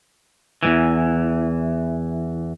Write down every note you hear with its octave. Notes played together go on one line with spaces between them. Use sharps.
E2 G#2 E3